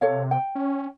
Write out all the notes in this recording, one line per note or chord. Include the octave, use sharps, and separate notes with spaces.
C3 A4 C#5 F5
G5
C#4